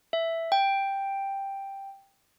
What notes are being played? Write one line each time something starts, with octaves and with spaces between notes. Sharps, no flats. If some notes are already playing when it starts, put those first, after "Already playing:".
E5
G5